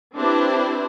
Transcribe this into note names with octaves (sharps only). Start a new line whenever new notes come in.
C4 D4 E4 G4 B4 C5